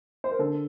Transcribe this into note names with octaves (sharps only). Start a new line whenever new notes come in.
C5
A#4
D3 A4